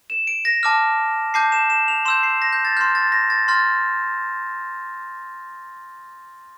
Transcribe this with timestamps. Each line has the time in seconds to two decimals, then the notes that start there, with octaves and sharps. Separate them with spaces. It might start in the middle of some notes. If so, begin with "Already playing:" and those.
0.10 E7
0.27 D7
0.45 A#6
0.63 A5 D6 F6
1.34 A5 D6 G6 C7
1.52 E7
1.70 E7
1.88 F7
2.05 C6 E6 G6 E7
2.23 C7
2.42 A#6
2.53 G6
2.65 A6
2.77 C6 F6 G6
2.95 A6
3.12 A#6
3.30 A6
3.48 C6 F6 A6